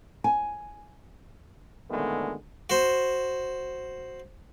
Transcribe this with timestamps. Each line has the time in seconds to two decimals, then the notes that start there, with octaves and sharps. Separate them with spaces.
0.24 G#5
1.91 A#2 D3 D#3 G#3 A3 B3
2.70 F#4 C5